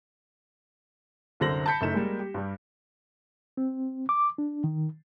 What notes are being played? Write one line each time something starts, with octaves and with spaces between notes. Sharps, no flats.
C2 F#2 D3 C5 A#6 F#7
A5 B5 G6 B6 C#7
F#1 F#2 A3 D#4 E4 E7
G3 G#3 A#3
G4
G2 G3
C4
D6
D4
D#3